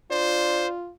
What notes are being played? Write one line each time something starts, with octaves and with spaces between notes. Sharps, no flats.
D4 F4 C5